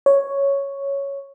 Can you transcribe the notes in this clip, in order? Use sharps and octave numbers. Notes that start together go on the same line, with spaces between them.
C#5